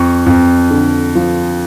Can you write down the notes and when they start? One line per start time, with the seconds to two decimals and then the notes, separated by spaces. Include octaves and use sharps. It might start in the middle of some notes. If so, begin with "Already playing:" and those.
Already playing: F2 C#6
0.26 F2
0.71 D3
1.15 F3